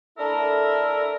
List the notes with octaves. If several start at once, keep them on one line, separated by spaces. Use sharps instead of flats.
A3 D4 E4 A4 A#4 E5